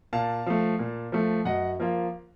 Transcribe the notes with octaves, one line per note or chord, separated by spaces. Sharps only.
A#2 F5 A5
F3 A3
A#2
F3 A3
F#2 D#5 F#5
F3 A#3 F4